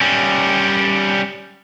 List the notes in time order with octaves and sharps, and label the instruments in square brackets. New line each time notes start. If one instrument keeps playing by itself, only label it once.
[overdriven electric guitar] G3 C#4